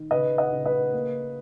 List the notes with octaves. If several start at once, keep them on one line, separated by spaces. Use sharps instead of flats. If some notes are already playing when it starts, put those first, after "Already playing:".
Already playing: D#3
C#3 B4 D#5
D#5 F#5
C#3
B4 D#5
A#3